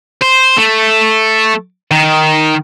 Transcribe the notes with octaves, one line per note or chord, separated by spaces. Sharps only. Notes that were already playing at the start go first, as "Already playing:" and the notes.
C5
A3
D#3